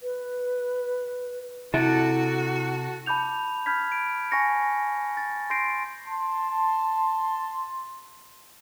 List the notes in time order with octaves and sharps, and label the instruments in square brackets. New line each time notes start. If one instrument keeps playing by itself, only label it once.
[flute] B4
[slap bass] C3 [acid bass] E4 [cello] F#4 [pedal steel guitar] A4 F#5 A5
[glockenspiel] A5 B5 D6 G6 F7
B5 F6 G6 G#6 B6
D7
G#5 C#6 A#6 C#7
A6
C6 G6 A#6 C7 D7
[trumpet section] A5 C6